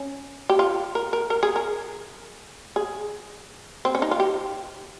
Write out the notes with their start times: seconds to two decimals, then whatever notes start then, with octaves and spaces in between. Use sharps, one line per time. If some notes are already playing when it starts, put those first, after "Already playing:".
Already playing: C#4
0.50 G4
0.59 F4
0.95 A#4
1.13 A#4
1.30 A#4
1.43 G#4
1.56 A#4
2.76 G#4
3.85 C4
3.95 C#4
4.02 D#4
4.11 F4
4.20 G4